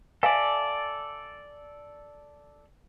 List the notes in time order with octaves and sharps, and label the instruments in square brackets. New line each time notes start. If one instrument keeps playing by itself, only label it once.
[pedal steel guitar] A4 D5 [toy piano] E5 F5 G#5